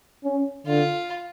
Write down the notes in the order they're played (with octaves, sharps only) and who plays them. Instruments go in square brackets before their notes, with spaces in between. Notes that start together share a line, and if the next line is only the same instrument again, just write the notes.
[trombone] C#4
[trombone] D3 [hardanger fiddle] F4